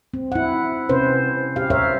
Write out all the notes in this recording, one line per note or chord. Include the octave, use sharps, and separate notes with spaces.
C4
E4 F#5
C3 C4 C#4 E4 B4 C5
G4 F5
A#4 C5 C#5 E5 F5